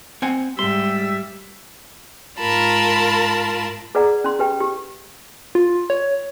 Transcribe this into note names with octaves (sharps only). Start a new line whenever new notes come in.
C4 F#5 G#5
G#2 G3 E5 C6
G#2 F4 A#4 A5 B5
G#4 B4 D5 F#5 A#5
C#4 C6
G4 B4 G5
G4
F4
C#5